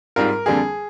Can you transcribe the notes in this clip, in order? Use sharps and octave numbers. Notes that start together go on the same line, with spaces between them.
G#2 G3 C4 F4 A#4
F2 D3 G3 A#3 G#4